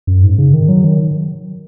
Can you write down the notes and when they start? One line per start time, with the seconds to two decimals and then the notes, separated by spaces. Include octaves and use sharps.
0.07 F#2
0.24 G#2
0.38 C#3
0.54 D#3
0.69 F#3
0.85 D#3